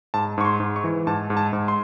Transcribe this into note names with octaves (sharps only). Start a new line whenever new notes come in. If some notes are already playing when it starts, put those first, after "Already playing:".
G#2 A5
G#2 C#6
C6
G#2
C#6
E3
G#2 A5
G#2
A5
G#2
C6